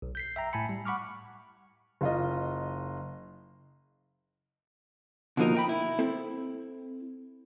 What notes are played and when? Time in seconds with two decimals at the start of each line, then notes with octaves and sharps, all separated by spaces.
0.02 B1
0.15 G6 B6 C7
0.36 E5 G5 A#5
0.53 A2 G#5 A5 B5 C#7
0.69 G3
0.85 F#5 B5 C#6 D6 F6
2.01 F#1 F4 D#5
5.37 B2 D3 F3 A#3 D#4 A#4
5.55 A#4 G5 B5
5.69 E4
5.99 C4 E4 A4